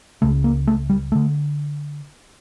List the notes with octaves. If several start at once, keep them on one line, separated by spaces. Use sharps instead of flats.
C#2 C#3 A3
A#3
A3
G3
D3 A3